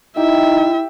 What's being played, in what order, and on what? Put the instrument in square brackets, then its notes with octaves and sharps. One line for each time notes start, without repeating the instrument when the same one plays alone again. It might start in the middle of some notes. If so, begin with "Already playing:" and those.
[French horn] D#4 [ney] E4 [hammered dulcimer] G4 [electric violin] E5